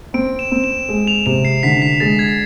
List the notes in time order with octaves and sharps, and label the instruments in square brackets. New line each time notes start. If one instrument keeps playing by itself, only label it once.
[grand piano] C4 [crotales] D7
[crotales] E7
[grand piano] C4
[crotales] E7
[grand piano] G#3
[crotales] F7
[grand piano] C3 [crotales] E7
[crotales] C7
[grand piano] D3 [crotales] B6
[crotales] B6
[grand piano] G#3 [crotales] A6
[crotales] G#6